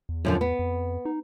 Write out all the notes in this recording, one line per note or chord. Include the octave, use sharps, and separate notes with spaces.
E2
F#2 D3 F3
B3
F2
D#4